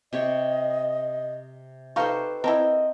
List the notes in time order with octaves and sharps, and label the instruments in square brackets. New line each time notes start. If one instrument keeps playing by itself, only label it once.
[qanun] C3 G4 C#5 [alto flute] D#5
[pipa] D#4 F5 C#6 [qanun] G4 A4 C5 [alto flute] B4
[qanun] C4 [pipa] E4 A4 A#4 [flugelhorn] D#5